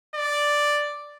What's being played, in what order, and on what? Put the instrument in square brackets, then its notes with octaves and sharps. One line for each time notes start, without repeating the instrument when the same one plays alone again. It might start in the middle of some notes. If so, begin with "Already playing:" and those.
[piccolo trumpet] D5